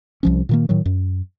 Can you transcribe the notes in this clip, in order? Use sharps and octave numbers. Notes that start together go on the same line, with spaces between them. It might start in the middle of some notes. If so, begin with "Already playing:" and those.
C2 F3 C#4
A#2 D#3 A#3
A2 D#3 F#3
F#2